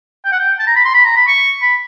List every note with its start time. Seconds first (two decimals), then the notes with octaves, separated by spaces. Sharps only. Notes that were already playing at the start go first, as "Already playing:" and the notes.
0.25 G5
0.32 F#5
0.39 G5
0.59 A5
0.67 A#5
0.76 B5
0.85 C6
0.94 B5
1.04 A#5
1.16 B5
1.28 C#6
1.62 B5